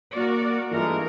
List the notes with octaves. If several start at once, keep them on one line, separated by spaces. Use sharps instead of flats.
A#3 F#4 A#4 D5
G2 E3 G#3 A3 F4 A#4